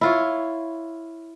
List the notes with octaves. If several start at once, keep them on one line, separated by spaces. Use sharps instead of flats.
E4 F4 C#5